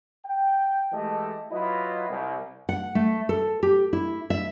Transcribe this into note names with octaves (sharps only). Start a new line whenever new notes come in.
G5
E3 G#3 A3 G4 A4 D#5
F#3 E4 F4 B4 D#5
C2
F#5
A3
A4
G4
E4
E5